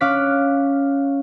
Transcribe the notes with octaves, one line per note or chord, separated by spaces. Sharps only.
C#4 F5 D6 F#6 B6